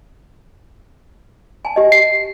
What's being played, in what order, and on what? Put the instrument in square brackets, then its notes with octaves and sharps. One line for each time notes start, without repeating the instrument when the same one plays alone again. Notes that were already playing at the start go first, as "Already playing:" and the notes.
[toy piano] G#5 A5
G4 D#5
[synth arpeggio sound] C7